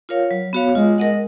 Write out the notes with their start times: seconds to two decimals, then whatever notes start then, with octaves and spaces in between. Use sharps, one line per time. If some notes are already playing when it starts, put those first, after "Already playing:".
0.09 F4 A#4 C#5 F5
0.31 F#3
0.53 B3 F#4 C#5 F5
0.75 G#3 F4
0.98 A#4 D#5 F#5